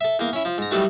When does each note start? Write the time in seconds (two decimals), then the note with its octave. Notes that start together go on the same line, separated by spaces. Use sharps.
0.01 A4 E5
0.19 E2 A#3
0.33 C#4 E4
0.45 F3
0.58 G#2 A#5
0.71 D#3 E3 F#3 G3 A3